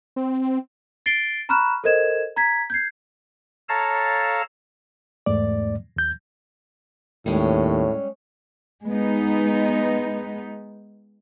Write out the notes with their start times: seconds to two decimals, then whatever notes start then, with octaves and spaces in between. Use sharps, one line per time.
0.16 C4
1.06 A6 C7 D7 G7
1.49 A#5 B5 C#6 F6 F#6 E7
1.84 A4 A#4 C5 D#5 G#6 E7
2.36 A#5 G#6 B6
2.70 G6 G#6 C7
3.69 A4 C#5 F5 A5 A#5
5.26 E2 G#2 A3 D5
5.96 D#2 G6
7.26 D#2 A2 G3 G#3 C#4
8.86 G#3 B3 D#4